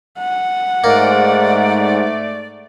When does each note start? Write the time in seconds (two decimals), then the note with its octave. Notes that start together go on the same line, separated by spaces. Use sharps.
0.19 F#5
0.84 G#2 A3 A#3 D5